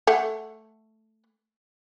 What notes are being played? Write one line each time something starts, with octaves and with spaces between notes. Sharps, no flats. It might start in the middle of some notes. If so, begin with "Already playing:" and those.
A3 F#5